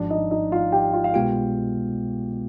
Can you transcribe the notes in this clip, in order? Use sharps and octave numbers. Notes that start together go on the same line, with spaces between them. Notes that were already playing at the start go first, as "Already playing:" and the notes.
Already playing: G#1 G#2 F3 D4 D5
D#4 D#5
D#4 D#5
F4 F5
G4 G5
F4 F5
F5
C2 B2 G#3 B3 F4 G4 G5